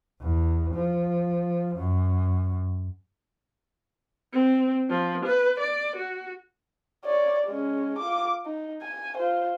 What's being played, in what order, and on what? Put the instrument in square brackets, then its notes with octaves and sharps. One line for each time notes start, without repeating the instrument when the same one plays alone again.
[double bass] E2
F3
F#2
[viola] C4
F3
B4
D5
F#4
[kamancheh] C#5 D5
G#3 C#4
F4 D6
D#4
G#5
F4 C5